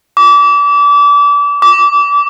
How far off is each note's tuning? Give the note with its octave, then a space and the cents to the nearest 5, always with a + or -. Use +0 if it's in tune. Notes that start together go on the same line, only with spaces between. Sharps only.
D6 -30
D6 -20